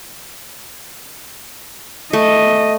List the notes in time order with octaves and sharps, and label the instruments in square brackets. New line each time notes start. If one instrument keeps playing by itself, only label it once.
[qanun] A3 [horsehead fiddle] D#5